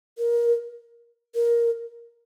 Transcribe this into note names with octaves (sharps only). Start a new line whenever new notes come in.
A#4
A#4